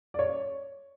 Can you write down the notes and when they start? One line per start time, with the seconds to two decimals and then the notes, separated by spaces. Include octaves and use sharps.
0.14 D5
0.19 C#5